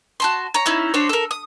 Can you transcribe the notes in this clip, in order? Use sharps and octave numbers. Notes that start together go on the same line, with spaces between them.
F#4 A5 C6
C#5 A#5
C#4 D#4 E4
D4 F#4 C5 C#5
A4 A#4
D#6